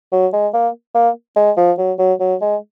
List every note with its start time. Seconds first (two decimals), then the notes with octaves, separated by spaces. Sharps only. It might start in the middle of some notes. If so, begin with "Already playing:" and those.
0.12 F#3
0.33 G#3
0.54 A#3
0.95 A#3
1.36 G#3
1.57 F3
1.78 F#3
1.99 F#3
2.20 F#3
2.41 G#3